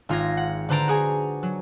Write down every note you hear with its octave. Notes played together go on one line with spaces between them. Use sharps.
G#1 F4 G#6 A#6
F#5
D3 B4 C5 A5 A#5 D7
F#4 G#4 G#5
F#3